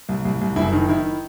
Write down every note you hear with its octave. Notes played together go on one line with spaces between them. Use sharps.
C2
C2
C2
F#1 E4
D#3
D#3 E4